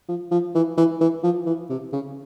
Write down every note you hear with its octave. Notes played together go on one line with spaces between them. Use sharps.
F3
F3
E3
E3
E3
F3
E3
C3
C#3